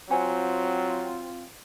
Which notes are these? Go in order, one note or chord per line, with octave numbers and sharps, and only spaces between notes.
F#3 C4 F4 C5 F#5 G#5